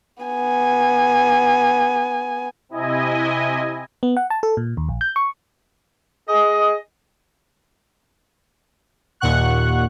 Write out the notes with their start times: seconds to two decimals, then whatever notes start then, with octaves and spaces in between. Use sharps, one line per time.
0.23 B3 G#5
2.69 C3 E4 D#5 G#5
4.03 B3
4.17 F#5
4.30 A5
4.43 A4
4.57 A#2
4.77 D#2
4.89 A#1
5.01 G6
5.16 C#6
6.28 G#4 D#5
9.20 D#2 A#2 F#5 C#6 F#6